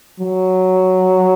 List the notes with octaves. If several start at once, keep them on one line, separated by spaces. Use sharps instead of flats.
F#3